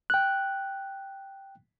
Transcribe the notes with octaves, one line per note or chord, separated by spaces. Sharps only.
G5 F#6